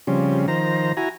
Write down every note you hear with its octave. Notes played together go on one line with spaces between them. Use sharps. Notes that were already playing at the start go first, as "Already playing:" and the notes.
C#3 F3 G3 C4 C#4
D#3 F3 C5 A#5
E4 F#4 G#5 A#5